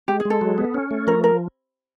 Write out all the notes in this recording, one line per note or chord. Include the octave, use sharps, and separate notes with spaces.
G#3 G4
G#4
G#3
A4
F#3
B3
C#4
A3
F3 A#4
A#4